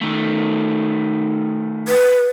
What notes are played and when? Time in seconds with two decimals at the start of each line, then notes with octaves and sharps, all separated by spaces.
0.01 D#3 A3
1.88 B4